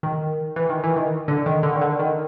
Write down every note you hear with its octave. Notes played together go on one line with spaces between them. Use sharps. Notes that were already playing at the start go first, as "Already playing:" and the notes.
D#3
E3
D#3
E3
D#3
D3
D#3
D3
D#3
D3
D#3